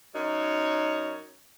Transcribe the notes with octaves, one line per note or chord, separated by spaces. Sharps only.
F#2 D#4 C#5